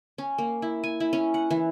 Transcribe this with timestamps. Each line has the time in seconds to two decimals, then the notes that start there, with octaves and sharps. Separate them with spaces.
0.18 C#4
0.38 A#3
0.62 E4
0.84 G#5
1.00 E4
1.13 C#4
1.34 F#5
1.51 E3